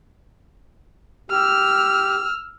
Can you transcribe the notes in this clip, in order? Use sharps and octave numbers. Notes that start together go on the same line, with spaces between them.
G4 E6 F6